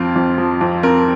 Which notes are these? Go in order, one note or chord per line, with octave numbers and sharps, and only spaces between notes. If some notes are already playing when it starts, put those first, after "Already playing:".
Already playing: F2 F3 C4 F4
F2
F3
F2
C4 A#4